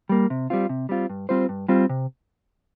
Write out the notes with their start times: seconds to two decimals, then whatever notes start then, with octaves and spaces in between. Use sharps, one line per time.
0.09 G3 A#3
0.30 C3
0.50 G3 C4 F4
0.69 C3
0.89 G3 C4 F4
1.10 G2
1.29 G3 C4 F4 C5
1.49 G2
1.69 G3 C4 F4 C5
1.90 C3